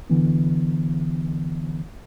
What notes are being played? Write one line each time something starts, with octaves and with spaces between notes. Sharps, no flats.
D3 E3 B3